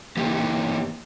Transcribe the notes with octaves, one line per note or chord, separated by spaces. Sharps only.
E3 A#3 G4